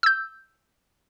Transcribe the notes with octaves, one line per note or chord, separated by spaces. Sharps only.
E6 G6